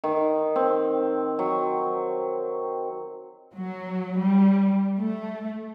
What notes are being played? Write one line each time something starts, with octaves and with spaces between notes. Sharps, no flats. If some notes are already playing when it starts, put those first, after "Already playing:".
D#3
C4
F#3
F#3
G3
A3